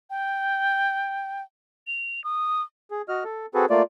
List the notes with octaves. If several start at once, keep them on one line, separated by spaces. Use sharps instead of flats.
G5
F7
D#6
G#4
F#4 D#5 F6
A4
C4 F#4 G#4 A4 B4
A3 A#3 F4 D5